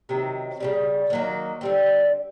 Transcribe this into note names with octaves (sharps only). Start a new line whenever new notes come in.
C3 D#3 F#3
C#3 E3 G3
D#3 F#3 A#3
D3 G3 C4